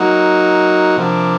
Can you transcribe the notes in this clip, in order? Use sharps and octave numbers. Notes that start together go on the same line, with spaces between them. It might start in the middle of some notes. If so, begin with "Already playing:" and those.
Already playing: F#3 A#3 D#4 F#4
C3 F3 A#3 D4